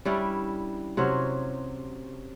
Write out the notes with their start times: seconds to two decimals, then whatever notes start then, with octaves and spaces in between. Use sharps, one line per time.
0.05 G3 C#4 D4 E4
0.97 C3 F#3 C#4 C5